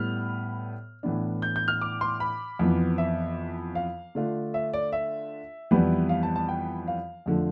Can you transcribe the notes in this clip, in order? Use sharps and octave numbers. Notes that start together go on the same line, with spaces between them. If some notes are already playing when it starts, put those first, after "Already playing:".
Already playing: A2 G3 B3 F6
A2 E3 B3 D4
G6
G6
F6
D6
C6
B5
F2 E3 B3
E5
F5
D3 A3 D4 F4
E5
D5
E5
F2 E3 G3 B3 E4
F5
A5
A5
G5
F5
F2 D3 F3 A3